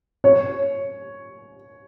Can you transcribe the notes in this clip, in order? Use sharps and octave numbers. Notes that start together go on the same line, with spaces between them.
C#5